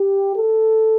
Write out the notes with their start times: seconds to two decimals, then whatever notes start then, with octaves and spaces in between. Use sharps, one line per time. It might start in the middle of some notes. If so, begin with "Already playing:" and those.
Already playing: G4
0.37 A4